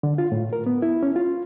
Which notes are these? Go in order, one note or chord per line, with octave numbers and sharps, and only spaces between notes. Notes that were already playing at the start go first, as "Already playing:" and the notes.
D3
F4
A2
A#4
B3
E4
C#4
F4